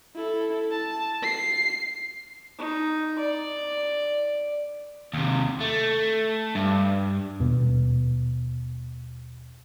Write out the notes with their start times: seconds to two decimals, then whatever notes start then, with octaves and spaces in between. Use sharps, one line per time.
0.15 E4 A4
0.71 A5
1.23 C7
2.58 D#4
3.19 D5
5.14 D#2 C3
5.60 A3
6.55 G2
7.40 D#1 B2